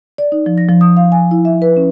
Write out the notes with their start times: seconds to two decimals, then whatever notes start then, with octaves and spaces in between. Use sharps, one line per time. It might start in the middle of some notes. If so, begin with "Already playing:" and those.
0.18 D5
0.32 D#4
0.46 F3
0.58 A#6
0.69 F3
0.81 D#6
0.97 F5
1.12 G#5
1.31 E4
1.45 E5
1.62 B4
1.77 C#4